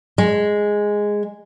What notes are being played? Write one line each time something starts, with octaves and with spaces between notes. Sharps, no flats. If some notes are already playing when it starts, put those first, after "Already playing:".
G#3